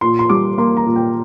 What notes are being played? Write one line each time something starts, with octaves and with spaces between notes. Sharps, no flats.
A#2 C6
C6
G3 D6
A#3 C6
A#5
A#2
G5